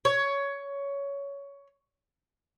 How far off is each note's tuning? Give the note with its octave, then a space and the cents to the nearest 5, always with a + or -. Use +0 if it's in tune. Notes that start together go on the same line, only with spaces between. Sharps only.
C#5 +15